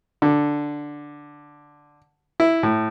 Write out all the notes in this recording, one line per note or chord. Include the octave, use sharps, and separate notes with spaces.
D3
E4
A2